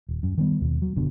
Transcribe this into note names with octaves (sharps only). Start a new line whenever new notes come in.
D#1
F#2
D#3 G3 B3
D#2 B2
F#3
F#1 B2 D3